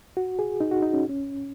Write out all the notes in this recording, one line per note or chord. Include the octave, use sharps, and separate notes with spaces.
F#4
G#4
D#4
F#4
D#4
C#4
C#4